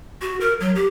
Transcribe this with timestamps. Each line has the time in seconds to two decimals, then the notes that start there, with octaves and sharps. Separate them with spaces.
0.22 F#4
0.40 A#4
0.60 F#3
0.75 G4